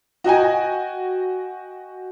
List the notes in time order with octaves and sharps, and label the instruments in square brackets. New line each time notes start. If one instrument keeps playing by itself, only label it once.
[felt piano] F#4 D#5 G5 G#5